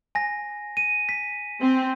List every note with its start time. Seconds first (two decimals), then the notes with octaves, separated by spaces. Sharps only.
0.15 G#5 A#6
0.77 D#7
1.09 B6
1.60 C4